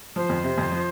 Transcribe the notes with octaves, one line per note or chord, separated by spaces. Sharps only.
F3 C5
F2
C3
F2
F3